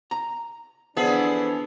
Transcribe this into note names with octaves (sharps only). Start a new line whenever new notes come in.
A#5
D3 E3 F3 B3 D4 G#4 E5